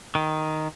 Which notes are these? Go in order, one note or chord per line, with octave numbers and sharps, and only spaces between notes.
D#3